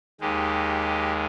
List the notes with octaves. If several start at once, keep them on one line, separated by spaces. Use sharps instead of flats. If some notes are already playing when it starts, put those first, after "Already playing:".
D#2 D#3 G#3 G4